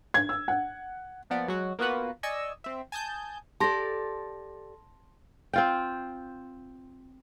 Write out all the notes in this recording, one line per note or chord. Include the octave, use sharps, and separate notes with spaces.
G#6
E6
F#5
F3 A#3 B3 D5
F#3 G#3 F#4
A#3 B3 F4 F#4 B4 F#5
D5 D#5 G#5 C#6 E6
C4 E5
G#5 A5 D#6 G6
G4 A4 D5 A5 C6 A#6
C4 F4 G5